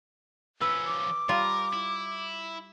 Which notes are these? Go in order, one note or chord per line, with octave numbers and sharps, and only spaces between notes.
F3 C#4 B4 E6
D6
G3 F4 A#4
E4